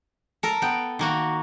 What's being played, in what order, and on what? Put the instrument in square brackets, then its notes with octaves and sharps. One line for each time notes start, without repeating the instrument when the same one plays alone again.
[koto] A4 A#4
B3 G5
D#3 A#3 F#4